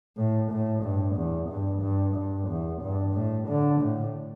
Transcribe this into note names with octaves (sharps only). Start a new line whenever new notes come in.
A2
A2
G2
E2
G2
G2
G2
E2
G2
A2
D3
A2